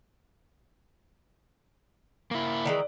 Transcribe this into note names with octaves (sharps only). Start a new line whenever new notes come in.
A#3 E4
D#3 E3 G#3 D5